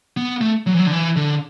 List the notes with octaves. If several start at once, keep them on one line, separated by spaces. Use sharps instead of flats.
B3
A3
F#3
E3
F#3
D3
E3
D3